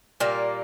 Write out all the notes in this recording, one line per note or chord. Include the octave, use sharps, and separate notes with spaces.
A#2 G3 A#3